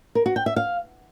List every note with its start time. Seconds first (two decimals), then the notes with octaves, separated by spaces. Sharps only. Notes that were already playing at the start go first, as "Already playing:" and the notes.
0.15 A#4
0.26 F#4
0.36 G5
0.46 E5
0.56 F5